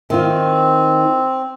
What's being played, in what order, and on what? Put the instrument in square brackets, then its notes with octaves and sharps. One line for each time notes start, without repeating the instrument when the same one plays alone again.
[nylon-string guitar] D#3 F4 [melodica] C4